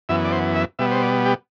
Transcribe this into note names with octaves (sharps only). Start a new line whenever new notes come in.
F#2 E3 B3 E5
D5
C5
E5
B2 G3 B3 E5
C5
D5
G4